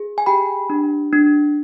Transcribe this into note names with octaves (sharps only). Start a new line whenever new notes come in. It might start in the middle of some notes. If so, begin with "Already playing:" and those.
Already playing: G#4
G#5
G4 G5 B5
D4
D4